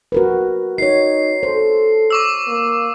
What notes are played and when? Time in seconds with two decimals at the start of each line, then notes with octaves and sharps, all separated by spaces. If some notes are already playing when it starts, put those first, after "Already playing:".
0.12 F#4 A#4 B4
0.78 D#4 F#4 C#5 C7
1.43 A4 C5
2.10 C#6 D6 E6
2.48 A#3